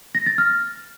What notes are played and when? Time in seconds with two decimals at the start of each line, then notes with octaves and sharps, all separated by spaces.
0.15 A#6
0.26 A6
0.38 F6